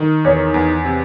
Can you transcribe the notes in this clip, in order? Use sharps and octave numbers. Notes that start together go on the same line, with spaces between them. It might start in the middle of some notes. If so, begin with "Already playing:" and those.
Already playing: D#3
E2 C#5
E2
C3